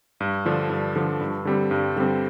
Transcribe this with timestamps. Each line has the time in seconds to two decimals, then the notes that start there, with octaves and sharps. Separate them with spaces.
0.20 G2
0.45 D3 F3 D4
0.70 G2 D4
0.96 D3 F3
1.21 G2
1.45 D3 G3 C4
1.71 G2
1.96 D3 G3 C4